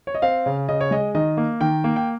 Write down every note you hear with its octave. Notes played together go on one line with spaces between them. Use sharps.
C#5
D#5
C4 F5
C#3
C#3 D#5
C#5
G#3 D#5
D#3 D#5
A#3
D#3 G5
A#3
G5